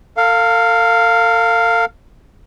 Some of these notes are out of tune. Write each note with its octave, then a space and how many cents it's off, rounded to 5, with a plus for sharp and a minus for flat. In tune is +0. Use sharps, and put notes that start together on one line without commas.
A4 +45 F5 +0